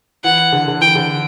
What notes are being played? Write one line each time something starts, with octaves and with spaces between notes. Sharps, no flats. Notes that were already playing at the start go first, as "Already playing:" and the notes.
E3 F#5
D3
D3
E3 G5
D3